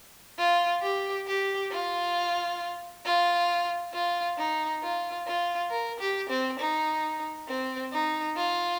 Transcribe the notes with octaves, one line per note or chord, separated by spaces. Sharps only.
F4
G4
G4
F4
F4
F4
D#4
F4
F4
A#4
G4
C4
D#4
C4
D#4
F4